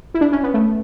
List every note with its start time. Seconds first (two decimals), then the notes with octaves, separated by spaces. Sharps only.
0.14 E4
0.21 D4
0.32 C#4
0.43 B3
0.54 A3